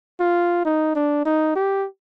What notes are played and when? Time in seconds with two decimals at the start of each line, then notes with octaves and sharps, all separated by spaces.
0.20 F4
0.65 D#4
0.95 D4
1.26 D#4
1.55 G4